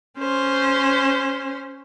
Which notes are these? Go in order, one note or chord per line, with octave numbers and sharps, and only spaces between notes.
C#4 C5